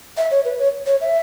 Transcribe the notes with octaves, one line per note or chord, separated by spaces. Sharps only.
E5
C#5
B4
C#5
C#5
E5